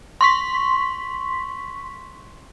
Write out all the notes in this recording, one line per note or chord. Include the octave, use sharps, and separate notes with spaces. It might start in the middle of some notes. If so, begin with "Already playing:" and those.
C6 C#6 B6